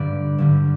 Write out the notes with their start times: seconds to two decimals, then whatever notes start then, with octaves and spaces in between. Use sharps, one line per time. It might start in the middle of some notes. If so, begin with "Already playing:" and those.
Already playing: G2 D3 G3 D5
0.38 G2 D3 G3